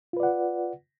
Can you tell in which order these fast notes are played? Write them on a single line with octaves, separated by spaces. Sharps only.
F4 B4 D5 F#5